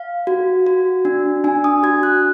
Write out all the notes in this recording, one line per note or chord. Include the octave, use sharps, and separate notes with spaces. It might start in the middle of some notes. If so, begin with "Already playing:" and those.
Already playing: F5
F#4
F#4
D4
D4 G#5
D#6
F#4 G#6
F#6